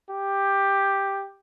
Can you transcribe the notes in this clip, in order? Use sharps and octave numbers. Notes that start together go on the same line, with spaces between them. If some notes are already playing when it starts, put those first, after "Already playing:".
G4